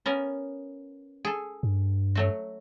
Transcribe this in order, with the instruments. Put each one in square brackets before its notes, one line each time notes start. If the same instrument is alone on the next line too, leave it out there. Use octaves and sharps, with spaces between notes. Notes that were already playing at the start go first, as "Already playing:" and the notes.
[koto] B3 C#4 A#4
G#4 A4
[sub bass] G2
[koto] F#3 A3 F#4